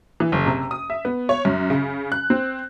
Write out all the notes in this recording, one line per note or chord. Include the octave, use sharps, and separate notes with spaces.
E3
F#1
C3
D#6
E5
B3
C#5
F#2
C#3
F#6
C4